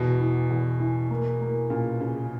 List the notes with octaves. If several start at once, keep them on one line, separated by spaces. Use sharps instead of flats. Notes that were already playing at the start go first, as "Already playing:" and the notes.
Already playing: E2 B2
E3
E2
E3
A#3
A#3
A#2 C#3
C#3